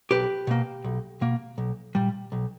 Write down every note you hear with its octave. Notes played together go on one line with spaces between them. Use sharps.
B1 G4 B4
B2 A#3
B1
B2 A#3
B1
A#2 G3
B1